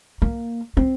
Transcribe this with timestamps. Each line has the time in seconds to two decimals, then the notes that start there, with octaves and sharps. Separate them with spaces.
0.22 A#3
0.77 C4